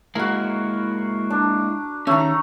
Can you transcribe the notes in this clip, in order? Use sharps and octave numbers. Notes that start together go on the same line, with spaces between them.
G#3 A#3 E4 F#4 A#4
D4
D#3 A3 C#4 A#5